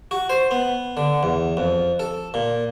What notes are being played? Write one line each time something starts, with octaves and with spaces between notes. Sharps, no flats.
F#4
C5
B3
D3
E2
F2
A4
A#2